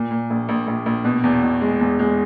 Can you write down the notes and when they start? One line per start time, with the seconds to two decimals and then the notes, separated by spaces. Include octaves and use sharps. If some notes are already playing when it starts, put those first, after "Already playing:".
Already playing: A#2
0.11 A#2
0.30 A#1
0.49 A#1
0.67 A#1
0.86 A#1
1.05 B2
1.24 E2
1.43 B2
1.61 G#3
1.81 E2
1.99 G#3